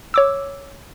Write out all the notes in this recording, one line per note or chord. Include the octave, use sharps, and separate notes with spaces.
C#5 D6 E6